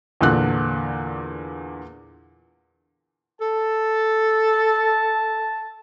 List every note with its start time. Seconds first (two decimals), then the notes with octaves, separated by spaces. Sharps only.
0.21 E2 A#2 D3 F#6
3.41 A4 A5